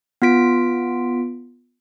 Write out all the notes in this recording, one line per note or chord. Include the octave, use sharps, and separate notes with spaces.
B3 F4 B6 D7